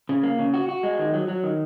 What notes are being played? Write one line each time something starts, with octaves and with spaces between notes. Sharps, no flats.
C#3
A#3
C#3
F#4
F#4
G#3
D#3
F#3
F#3
D#3